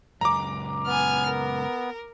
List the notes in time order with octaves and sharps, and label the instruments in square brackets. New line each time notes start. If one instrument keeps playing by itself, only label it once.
[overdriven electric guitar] C#2 F#2 [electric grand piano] A#5 D6
[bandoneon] B3 [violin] G#5 F6
[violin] A#4